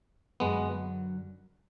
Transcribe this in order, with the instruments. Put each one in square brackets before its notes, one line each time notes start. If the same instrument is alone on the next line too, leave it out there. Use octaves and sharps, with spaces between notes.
[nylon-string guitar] F#2 D3 F#3 [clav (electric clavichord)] G#3 B3